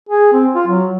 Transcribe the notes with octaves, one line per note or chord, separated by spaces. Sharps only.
G#4
C4
F4
F#3